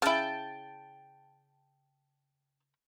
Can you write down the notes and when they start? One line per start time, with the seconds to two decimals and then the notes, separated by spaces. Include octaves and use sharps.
0.02 C#3 E4 G5 A5